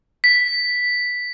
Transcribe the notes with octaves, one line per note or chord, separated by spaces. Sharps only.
B6